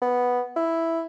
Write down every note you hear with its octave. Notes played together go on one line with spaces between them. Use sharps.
B3
E4